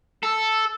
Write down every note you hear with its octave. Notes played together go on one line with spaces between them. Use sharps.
A4